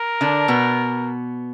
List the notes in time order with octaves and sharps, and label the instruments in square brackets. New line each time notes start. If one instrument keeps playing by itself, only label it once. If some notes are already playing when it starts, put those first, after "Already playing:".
Already playing: [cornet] A#4
[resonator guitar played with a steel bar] D3 D4
B2 B3